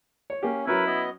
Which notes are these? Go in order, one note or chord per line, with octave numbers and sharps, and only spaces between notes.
C#5
A#3 C#4 G4
F#3 C#4 E4 A#4 B4
B3 D#5